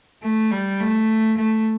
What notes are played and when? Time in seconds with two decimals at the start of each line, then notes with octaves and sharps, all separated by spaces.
0.22 A3
0.51 G3
0.80 A3
1.38 A3